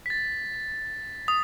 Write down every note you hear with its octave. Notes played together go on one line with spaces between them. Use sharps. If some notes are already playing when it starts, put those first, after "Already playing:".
B6
A6
D#6